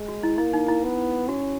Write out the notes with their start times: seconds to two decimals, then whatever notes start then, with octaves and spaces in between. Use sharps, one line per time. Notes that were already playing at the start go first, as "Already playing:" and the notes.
Already playing: G#3
0.08 F#4
0.23 E4
0.38 A#3 E4
0.53 D#4
0.68 E4
0.84 B3
1.29 C#4 F#4